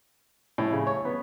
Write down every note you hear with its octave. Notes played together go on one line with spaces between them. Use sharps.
A2
C#3
C#5
B3